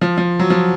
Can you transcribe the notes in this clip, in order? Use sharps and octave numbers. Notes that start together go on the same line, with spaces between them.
F3
F3
F#3
F3